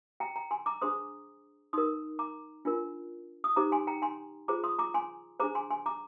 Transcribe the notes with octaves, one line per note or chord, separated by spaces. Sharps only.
G5 A#5
G5 A#5
G#5 C6
A#5 D6
D4 G#4 C5 C6 D#6
D#4 A#4 C6 D#6
A#5 D6
D4 F4 A#4
D#6
D#4 G4 C5 A#5 D6
G#5 C6
G5 A#5
G#5 C6
F4 G#4 C5 A#5 D6
C6 D#6
A#5 D6
G#5 C6
D4 G#4 C5 A#5 D6
G#5 C6
G#5 C6
A#5 D6